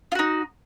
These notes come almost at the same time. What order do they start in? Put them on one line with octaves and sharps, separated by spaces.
F4 F#4 D#4